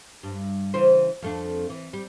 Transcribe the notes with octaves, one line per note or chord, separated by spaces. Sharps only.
G2
C#3 E3 C5
F2 A3 D4
E3
G3